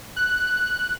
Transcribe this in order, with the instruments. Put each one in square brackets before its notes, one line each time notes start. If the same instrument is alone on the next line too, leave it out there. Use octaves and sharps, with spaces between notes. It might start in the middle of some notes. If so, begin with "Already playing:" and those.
[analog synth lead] F#6